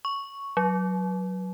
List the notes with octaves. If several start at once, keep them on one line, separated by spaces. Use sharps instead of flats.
C#6
F#3